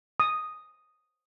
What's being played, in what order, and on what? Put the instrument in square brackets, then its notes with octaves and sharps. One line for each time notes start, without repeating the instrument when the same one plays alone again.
[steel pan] D#6